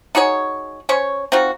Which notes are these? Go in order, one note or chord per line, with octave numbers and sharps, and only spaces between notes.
D#4 F#4 G#4 C#5
C#4 C5 C#5
C4 D#4 F4 F#4